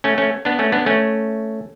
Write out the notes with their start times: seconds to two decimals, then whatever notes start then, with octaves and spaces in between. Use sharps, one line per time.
0.04 A3 C#4
0.18 A3 C#4
0.45 B3 D4
0.59 A3 C#4
0.72 B3 D4
0.86 A3 C#4